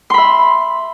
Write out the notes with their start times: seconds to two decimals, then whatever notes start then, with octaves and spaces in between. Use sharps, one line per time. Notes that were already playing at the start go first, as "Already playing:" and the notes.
0.10 C6
0.14 B5
0.18 E5